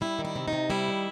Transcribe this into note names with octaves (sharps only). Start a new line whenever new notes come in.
G3 E4
D#3
E4
C3
D#4
C3
G3 E4
D#3